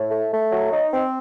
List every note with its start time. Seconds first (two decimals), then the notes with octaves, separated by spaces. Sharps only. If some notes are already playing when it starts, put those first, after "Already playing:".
Already playing: A2
0.10 A3
0.32 A3
0.52 F#3
0.72 D#4
0.92 C4